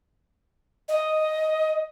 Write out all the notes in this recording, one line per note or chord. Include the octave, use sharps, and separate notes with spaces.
D#5